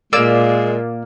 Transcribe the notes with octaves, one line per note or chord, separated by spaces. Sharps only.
A#2 G#3 A#3 D5 E6